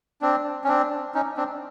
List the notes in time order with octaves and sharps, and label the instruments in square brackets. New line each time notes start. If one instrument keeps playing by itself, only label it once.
[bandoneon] C4 D4
C#4
C4 D4
C#4 D#4
C4 D4